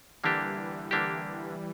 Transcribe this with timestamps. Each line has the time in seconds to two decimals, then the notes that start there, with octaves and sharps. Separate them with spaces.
0.24 D3 E3 G3 A#3 D4 G4
0.91 D3 A#3 D4 G4